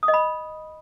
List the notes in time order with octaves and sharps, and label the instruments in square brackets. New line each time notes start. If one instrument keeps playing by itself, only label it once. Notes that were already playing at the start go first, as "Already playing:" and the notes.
[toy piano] D#6
D#5
B5